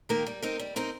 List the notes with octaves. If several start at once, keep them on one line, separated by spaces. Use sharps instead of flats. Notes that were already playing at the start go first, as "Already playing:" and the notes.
D#3 A#3 G4 A#4
G3
C4 D#4 A#4
G3
C4 D#4 A#4